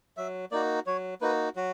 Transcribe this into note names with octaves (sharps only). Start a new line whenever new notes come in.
F#3 E5
A#3 D#4 F#4 D5
F#3 C#5
A#3 D#4 F#4 B4
F#3 F#4